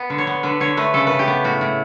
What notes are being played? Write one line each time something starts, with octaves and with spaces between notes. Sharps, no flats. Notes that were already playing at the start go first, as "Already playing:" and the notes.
Already playing: B3
D3
C#5
B3
D3 B4
D3 C#5
A3 B4
C#3 A4
C#3 B4
G4
B3
A2 F#4
A2